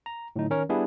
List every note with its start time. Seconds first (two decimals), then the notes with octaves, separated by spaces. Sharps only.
0.06 A#5
0.36 A2 D3 F#3 D#4
0.50 D#3 C#4 A#4 C#5
0.69 G3 B3 D4 E4 G#4